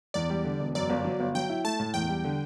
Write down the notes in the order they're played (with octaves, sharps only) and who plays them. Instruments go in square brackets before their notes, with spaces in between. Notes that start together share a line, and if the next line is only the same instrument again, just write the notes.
[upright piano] E2 [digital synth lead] D5
[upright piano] G3
D3
E1
[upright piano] F#2 [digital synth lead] D5
[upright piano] G1
F#3
G1
[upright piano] F#3 [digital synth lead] G5
[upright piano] E4
[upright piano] A3 [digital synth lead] A5
[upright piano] A2
[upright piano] E2 [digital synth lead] G5
[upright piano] G3
D3